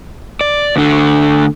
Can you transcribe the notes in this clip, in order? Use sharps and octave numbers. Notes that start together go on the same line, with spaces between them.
D5
D2 D3